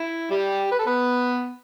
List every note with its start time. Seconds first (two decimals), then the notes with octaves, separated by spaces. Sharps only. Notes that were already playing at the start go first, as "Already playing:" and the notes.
Already playing: E4
0.31 G3 G4
0.71 B4
0.79 A4
0.87 B3 B4